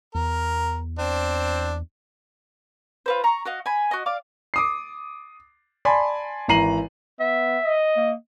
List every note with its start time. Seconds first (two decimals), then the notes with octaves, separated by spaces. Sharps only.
0.15 E2 A#4
0.99 C4 D4
3.06 F4 B4 C5
3.24 A#5 C#6
3.45 F#4 D#5 F5
3.66 G#5 B5
3.91 F#4 D#5
4.06 D5 F5 D6
4.54 D6 D#6 C7
5.85 D5 G#5 A5 B5 C6
6.48 G#1 E3 A#5 C7 D#7 F#7
7.20 B3 E5
7.63 D#5
7.97 A#3